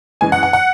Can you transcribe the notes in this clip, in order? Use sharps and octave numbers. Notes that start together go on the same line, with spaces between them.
F#2 E3 G#3 G#5
F#5
F#5
F#5